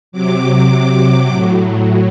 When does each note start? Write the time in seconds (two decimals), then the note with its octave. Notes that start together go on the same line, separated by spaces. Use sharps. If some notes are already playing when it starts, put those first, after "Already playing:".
0.12 C3 F#3 D6
1.29 A2 F#3